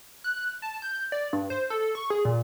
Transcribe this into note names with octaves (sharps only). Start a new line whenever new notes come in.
F#6
A5
G6
D5
G2
C5
A4
C#6
G#4
A#2